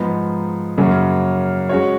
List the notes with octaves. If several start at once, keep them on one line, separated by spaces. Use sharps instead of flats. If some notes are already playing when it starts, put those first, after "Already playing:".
Already playing: G#2 F3 B3 D#4
F#2 C#3 F#3 A#3 C#4
G#3 C#4 F#4 C#5